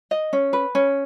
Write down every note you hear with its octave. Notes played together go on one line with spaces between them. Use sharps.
D#5
C#4
B4
C#4